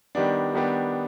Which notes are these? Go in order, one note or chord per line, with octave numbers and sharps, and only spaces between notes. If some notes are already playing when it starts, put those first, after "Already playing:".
D#3 G3 B3 D4
D#3 G3 B3 D4